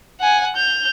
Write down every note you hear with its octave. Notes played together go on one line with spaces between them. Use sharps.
F#5 G#5
G6 F7